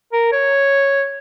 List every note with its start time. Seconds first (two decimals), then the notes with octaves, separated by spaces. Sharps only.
0.13 A#4
0.32 C#5